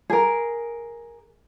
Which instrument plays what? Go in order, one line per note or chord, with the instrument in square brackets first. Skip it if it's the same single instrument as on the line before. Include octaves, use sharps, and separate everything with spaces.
[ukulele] G#4 A#4